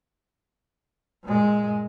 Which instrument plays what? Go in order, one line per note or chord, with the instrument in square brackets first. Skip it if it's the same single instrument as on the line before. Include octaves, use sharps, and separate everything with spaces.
[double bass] A#2 G#3